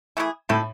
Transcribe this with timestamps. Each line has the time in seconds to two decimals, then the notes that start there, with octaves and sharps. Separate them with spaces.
0.17 E3 A3 E4 G#4
0.49 A2 A3 E4 A4